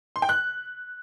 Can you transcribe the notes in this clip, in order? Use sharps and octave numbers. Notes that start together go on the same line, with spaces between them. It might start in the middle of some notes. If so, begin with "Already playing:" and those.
C6
G5
F#6